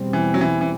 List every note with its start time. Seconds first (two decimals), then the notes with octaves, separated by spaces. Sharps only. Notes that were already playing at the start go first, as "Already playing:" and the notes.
Already playing: E2 B2 G3 C4
0.13 E3
0.34 F#3
0.41 E3
0.61 E3